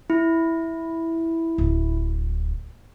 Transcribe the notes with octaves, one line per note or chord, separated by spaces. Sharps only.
E4
D1